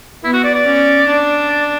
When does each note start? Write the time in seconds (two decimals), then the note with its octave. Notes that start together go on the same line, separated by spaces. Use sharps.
0.24 B3 E4
0.33 F#4
0.44 D5
0.54 D5
0.66 C#4
1.06 D4
1.49 D5